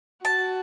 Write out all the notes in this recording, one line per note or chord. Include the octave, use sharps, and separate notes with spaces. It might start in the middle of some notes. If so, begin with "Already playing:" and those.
F#4 A5